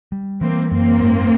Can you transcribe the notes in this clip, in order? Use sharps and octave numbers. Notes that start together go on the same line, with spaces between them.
G3
E3 A#3 C4
F#2 A#3 C4
G#2